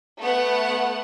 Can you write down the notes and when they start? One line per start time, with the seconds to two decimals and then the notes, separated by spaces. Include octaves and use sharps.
0.20 A3 B3 F#5